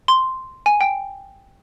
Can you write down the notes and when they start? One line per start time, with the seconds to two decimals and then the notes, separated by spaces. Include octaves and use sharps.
0.08 C6
0.66 G#5
0.81 G5